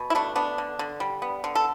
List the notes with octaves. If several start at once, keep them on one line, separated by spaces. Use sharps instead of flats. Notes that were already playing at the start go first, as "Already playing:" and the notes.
Already playing: B2
E4
A3 D4
B3 D4
D3
D3
G3
B3
D3
A4